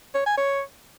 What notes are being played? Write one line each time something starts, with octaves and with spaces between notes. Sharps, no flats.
C#5
G#5
C#5